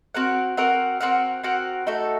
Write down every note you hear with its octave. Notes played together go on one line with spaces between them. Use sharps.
C4 F#4 A#4 F#5
C4 F#4 A#4 F#5
C4 F#4 A#4 F#5
C4 F#4 A#4 F#5
A3 D#4 F#4 A4